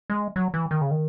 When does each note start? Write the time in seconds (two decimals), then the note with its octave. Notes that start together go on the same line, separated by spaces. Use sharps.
0.10 G#3
0.36 F#3
0.54 E3
0.71 D#3
0.81 C#3
0.91 D#3